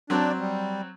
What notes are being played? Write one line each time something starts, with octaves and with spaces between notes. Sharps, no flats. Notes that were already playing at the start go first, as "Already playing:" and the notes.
F#3 C4 D4
G3